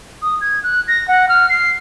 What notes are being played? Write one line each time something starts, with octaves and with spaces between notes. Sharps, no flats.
D#6
G#6
F#6
A#6
F#5
F6
C7